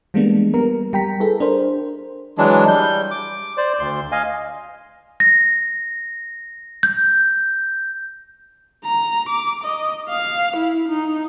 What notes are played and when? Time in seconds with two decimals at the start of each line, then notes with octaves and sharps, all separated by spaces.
0.14 E3 G3 G#3 A#3 B3 D4
0.54 G3 B3 A#4
0.93 G3 G5 A#5 B6
1.20 E4 G#4 A4 B4
1.40 D4 A#4 C5
2.38 E3 F#3 G#3 D4
2.68 G3 G6
3.11 D6
3.57 C5 D5
3.80 D2 C6
4.12 D#5 F5 G#5
5.20 A#6
6.83 G6
8.84 A#5
9.29 D6
9.64 D#5
10.09 F5
10.56 E4
10.88 D#4